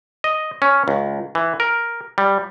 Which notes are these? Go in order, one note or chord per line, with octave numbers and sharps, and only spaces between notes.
D#5
C#4
C#2
E3
A#4
G3